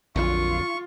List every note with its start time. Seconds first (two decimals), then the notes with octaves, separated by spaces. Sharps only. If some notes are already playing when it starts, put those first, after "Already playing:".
0.16 A#1 F2 D3 F#3 F4 C#6